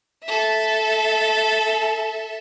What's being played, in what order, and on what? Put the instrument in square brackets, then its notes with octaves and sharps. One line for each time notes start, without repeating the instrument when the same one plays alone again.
[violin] A4 E5